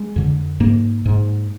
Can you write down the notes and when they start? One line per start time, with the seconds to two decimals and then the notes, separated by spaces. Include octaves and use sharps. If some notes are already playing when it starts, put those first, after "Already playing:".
Already playing: G#3
0.16 F2 D3
0.60 G#2 A#3
1.05 G#2